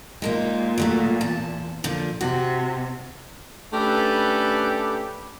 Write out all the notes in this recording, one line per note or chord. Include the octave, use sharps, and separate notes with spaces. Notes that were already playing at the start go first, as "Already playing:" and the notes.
A#2 G#3 A#3 D#4
F#3 G#3 A3
E2 A5
A#2 D3 F3
C3 F#4
A3 C#4 D4 G4 A4 B4